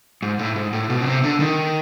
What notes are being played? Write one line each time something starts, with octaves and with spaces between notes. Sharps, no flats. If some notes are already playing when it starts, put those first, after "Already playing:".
G#2
A2
G#2
A2
B2
C#3
C3
D3
D#3